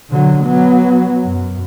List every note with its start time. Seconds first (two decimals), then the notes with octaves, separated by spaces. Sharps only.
0.10 D3 F#3
0.44 F#3 B3
1.23 F#2